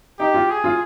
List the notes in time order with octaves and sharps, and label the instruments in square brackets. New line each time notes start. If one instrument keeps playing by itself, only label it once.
[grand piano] D#4 [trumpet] G4
[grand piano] F4
[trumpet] G#4
[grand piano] F4